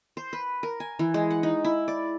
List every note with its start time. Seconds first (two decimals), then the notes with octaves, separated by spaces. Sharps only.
0.17 C5
0.33 B4
0.63 A#4
0.80 G#5
0.99 E3
1.14 G#3
1.30 F#5
1.43 D#4
1.64 E4
1.88 D5